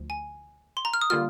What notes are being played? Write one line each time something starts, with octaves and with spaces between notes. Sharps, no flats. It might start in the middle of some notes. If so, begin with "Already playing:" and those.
Already playing: D2 F3
G#5
C6
A#5
F6
D#6
D3 G3 A#3 F4 F6